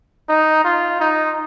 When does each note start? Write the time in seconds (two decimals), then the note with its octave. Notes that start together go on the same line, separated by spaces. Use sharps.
0.29 D#4
0.64 F4
1.00 D#4